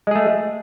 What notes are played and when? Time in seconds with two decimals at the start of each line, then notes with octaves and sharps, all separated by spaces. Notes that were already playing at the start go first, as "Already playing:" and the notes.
0.07 G#3
0.11 G#4
0.15 A3